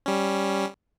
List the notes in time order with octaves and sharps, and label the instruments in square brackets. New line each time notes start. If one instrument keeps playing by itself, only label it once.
[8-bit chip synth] G3 C#4